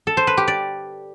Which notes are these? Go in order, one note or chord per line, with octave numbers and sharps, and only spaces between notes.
A4
C5
B4
G4
D5